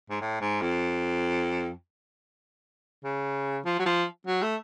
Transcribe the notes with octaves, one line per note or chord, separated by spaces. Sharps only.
G#2
A2
G#2
F2
C#3
F3
F#3
F3
F#3
A3